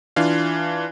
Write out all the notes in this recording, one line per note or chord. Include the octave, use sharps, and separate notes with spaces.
E3 D4 F4 F5